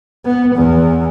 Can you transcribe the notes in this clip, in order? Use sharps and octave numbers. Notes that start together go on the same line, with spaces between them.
B3
E2